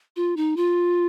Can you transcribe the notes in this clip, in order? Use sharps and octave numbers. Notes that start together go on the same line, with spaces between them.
F4
D#4
F4